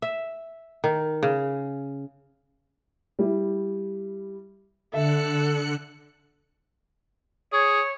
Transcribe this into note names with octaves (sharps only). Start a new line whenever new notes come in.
E5
D#3
C#3
G3 E4
D3 A4 E5 F#6 C#7
G#4 C#5